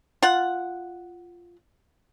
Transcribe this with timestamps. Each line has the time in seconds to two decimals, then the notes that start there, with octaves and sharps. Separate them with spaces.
0.22 F4 F#5